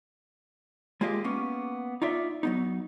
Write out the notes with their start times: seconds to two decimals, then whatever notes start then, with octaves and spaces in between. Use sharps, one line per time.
1.01 G#3 A#3 F4 G4 D#5
1.24 A#3 B3 C#4
2.02 D#4 F4 D5 E5
2.43 F#3 B3 D#4